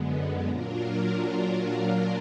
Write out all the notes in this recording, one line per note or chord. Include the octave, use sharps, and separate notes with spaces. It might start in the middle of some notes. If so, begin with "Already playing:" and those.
Already playing: F#2 D3 G#3 B3
A#2 F#3 D4 F4 A#4